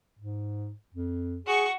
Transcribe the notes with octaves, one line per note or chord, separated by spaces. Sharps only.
G#2
F2
F#4 G#4 C#6